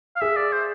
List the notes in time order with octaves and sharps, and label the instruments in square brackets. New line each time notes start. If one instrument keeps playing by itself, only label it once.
[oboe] F5
[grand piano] G#4 [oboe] E5
[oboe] D5
C5